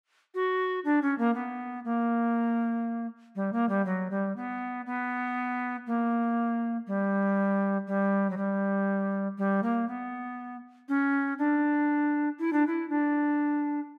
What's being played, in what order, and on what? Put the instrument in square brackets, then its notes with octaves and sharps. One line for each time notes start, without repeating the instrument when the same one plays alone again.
[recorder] F#4
D4
C#4
A#3
B3
A#3
G3
A#3
G3
F#3
G3
B3
B3
A#3
G3
G3
F#3
G3
G3
A#3
B3
C#4
D4
E4
D4
E4
D4